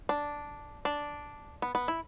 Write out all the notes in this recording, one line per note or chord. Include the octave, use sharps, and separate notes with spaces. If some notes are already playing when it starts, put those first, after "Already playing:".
D4
D4
B3
B3
E4